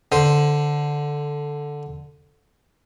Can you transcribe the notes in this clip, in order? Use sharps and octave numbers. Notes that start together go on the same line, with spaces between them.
D3 C5